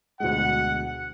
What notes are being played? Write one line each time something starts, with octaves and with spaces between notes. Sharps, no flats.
D2 B2 G#3 F#5